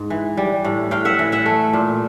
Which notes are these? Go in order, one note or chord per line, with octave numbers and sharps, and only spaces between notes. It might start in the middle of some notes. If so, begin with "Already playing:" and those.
Already playing: G#2
E3
G3
A2
A2 F5 G5
E5 F#5
E3
E5 F#5
A3
A#2